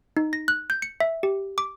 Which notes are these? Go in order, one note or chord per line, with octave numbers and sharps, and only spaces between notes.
D#4
A#6
F#6
G6
C#7
E5
G4
D6